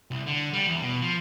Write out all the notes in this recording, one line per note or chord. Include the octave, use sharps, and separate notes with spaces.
C2
D3
G3
E2
B2
F3